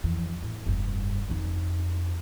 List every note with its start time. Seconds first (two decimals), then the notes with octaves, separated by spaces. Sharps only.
0.04 F2 E3
0.43 A2
0.66 F1 G2
1.30 F2 D#4